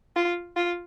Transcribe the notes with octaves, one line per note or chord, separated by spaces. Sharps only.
F4
F4